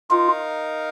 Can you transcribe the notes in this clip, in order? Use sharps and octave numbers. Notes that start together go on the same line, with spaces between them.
D#4 F4 A#4 F5